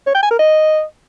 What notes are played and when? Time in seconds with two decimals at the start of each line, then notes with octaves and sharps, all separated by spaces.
0.07 C#5
0.15 G5
0.23 G#5
0.31 A#4
0.39 D#5